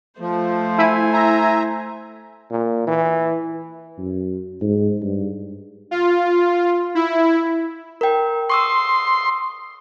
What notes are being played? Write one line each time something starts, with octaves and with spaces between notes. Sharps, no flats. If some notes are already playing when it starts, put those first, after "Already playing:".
F3 A3 C5
E4 G#5
E5 A#5
A#2
E3
F#2
G#2
G2
F4
E4
A#4 G5
C6 C#6 D#6 E6